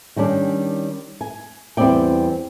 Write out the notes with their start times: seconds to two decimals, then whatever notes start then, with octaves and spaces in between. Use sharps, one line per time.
0.16 D#3 G3 C#4 D4
1.21 G#5
1.77 E2 G3 B3 C4 D5 G5